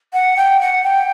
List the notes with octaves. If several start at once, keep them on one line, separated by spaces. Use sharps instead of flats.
F#5
G5
F#5
G5